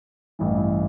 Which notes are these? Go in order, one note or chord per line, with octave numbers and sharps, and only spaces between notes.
A1 G2 E3